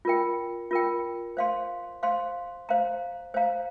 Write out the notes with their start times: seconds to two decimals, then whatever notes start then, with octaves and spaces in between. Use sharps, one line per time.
0.05 F4 A#4 G5
0.71 F4 A#4 G5
1.37 C5 F5 C6
2.03 C5 F5 C6
2.69 C5 F5 A#5
3.34 C5 F5 A#5